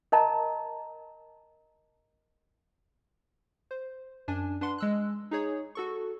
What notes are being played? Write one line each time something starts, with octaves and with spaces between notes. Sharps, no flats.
A#4 D#5 A5 A#5
C5
F#2 D4 G#5
D4 B4 F#5 C6
G#3 E6 F#6
D#4 G#4 C#5
F#4 A4 C#6